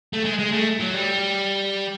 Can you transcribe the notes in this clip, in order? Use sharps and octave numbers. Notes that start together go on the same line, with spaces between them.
A3
G#3
G#3
A3
F#3
G3